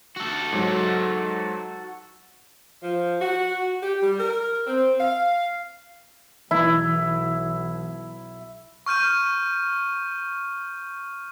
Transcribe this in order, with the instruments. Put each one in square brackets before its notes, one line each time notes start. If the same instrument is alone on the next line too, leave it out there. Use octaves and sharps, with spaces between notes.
[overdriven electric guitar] F#4 A4
[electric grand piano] G#2 F#3
[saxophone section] F3
F#4
G4
G3
A#4
C4
F5
[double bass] B1 [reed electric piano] E3 [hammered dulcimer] E4
[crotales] C#6 F6 G6 D#7